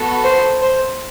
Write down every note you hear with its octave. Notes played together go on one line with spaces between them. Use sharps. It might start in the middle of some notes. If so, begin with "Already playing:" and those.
Already playing: B3 F#4 A4
C5
C5